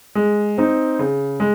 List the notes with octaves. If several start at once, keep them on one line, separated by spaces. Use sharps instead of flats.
G#3
C4 D#4
C#3
G#3